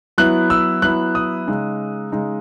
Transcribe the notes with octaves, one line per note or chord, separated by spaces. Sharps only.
F#3 B3 E4 F#6
E6
F#3 B3 E4 F#6
D#6
C#3 G#3 D#4
C#3 G#3 D#4